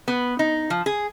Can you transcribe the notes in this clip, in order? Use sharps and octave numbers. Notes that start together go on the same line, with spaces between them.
B3
D#4
F3
G#4